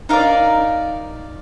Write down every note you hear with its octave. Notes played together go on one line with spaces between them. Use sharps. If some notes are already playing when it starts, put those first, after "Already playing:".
D#4 A#4 D5 F5